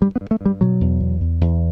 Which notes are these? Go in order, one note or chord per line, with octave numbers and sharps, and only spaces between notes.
G2 G3
B3
G2
A3
G2 G3
B2 F#3
E2
E2
E2
E2